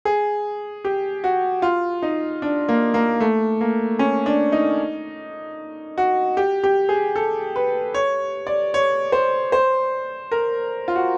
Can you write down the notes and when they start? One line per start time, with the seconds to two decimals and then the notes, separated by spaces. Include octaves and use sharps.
0.05 G#4
0.85 G4
1.24 F#4
1.62 F4
2.02 D#4
2.42 D4
2.69 A#3
2.94 A#3
3.20 A3
3.61 A#3
3.99 C#4
4.26 D4
4.52 D#4
5.98 F#4
6.37 G4
6.64 G4
6.89 G#4
7.16 A4
7.56 B4
7.94 C#5
8.47 D5
8.74 C#5
9.12 C5
9.52 C5
10.31 A#4
10.88 F4
10.96 F#4